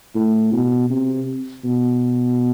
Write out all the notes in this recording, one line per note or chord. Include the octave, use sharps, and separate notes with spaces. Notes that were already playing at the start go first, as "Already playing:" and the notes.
A2
B2
C3
B2